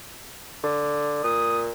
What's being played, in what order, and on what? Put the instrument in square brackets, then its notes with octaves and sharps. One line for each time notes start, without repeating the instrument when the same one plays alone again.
[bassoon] D3
[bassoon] A#2 [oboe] D#6